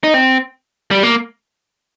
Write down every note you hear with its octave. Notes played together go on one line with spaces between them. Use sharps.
D#4
C4
G3
A#3